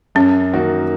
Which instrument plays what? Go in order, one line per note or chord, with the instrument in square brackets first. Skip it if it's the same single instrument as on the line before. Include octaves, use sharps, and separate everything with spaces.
[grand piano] F#2 [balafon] C#4
[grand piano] D#3 A#3 D#4 F#4